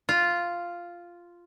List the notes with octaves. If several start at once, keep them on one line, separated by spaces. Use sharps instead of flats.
F4